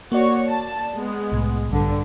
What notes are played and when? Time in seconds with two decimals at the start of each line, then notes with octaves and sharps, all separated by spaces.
0.12 A#3 F#4 C#5 D5 C#6
0.49 A5
0.97 G#3 B3
1.32 C2 A2
1.69 A#1 G2 D3